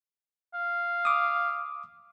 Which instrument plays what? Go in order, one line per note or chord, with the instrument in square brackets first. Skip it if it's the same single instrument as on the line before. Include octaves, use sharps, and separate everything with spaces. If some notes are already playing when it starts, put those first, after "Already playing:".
[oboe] F5
[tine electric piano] D6 D#6